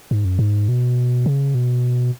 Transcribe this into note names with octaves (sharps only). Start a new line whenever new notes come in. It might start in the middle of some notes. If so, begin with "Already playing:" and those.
G#2
F#2
G#2
B2
C#3
B2